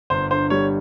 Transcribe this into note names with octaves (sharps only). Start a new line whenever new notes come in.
G1 C5
D3 C5
G3 C#5